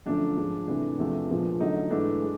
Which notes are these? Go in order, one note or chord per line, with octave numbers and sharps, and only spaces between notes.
F#2 D3 F3 A3 D4
G#2 F3 G#3
C2 C3 E3 A3 D4
E2 C3 F3 A3
A#2 F3 G#3 B3
F#2 D3 F#3 A3 D#4
G#2 E3 A3 D4
G#3